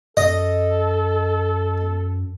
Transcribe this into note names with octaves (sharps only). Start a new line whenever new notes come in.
F#2 A4 D#5